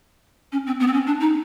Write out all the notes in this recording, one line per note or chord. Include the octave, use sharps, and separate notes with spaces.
C#4
C4
B3
C4
C#4
D4
D#4